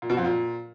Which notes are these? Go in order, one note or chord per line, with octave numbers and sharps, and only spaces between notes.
A#2
B2
F2
A#2